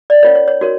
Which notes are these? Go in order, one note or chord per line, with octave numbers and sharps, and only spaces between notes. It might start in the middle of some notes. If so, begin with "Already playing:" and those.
D5
C#4 F4 A#4 C#5
C#5
C#5
D#4 F#4 A#4 C#5